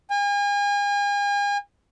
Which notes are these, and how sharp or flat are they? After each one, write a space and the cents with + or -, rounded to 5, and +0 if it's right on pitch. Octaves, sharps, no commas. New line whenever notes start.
G#5 -40